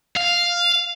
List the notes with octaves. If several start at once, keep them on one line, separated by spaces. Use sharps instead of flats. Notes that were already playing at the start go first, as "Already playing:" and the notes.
F5